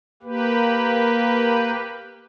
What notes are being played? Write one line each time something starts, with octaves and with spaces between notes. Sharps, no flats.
A#3 G4 B4